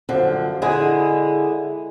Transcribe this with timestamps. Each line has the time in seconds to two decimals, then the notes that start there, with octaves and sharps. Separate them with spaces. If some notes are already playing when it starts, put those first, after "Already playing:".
0.09 F#2 D3 F3
0.62 D3 G#3 E4 G#4